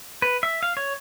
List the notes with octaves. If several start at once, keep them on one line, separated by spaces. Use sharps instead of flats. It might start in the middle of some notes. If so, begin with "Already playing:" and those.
B4
E5
F5
C#5